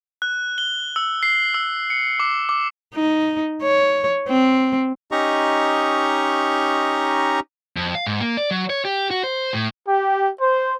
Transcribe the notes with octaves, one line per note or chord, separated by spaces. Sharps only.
F#6
G7
E6
C7
E6
C#7
D6
D6
D#4
C#5
C4
C#4 D#4 G4 D#5 A#5 C#6
F2
F5
G#2
A#3
D5
F#3
C#5
G4
F#4
C5
A2
G4
C5